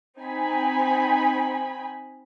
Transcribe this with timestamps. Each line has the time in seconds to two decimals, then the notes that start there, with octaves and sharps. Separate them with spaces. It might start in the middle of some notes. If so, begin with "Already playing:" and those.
0.18 C4 D#4 G#5 B5